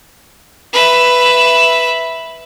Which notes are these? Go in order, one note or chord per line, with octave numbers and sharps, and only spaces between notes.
B4 E5